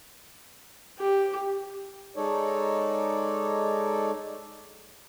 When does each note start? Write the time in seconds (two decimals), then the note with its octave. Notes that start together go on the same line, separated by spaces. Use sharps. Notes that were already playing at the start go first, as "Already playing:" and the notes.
0.99 G4
2.15 G#3 D#4 A4 C#5 D5